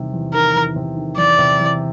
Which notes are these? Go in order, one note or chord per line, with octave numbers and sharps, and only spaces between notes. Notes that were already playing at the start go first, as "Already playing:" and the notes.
Already playing: E2 C3 D#3 G3
E2
D#3 A#4
E2
C3
D#3
E2 D5
C3
E2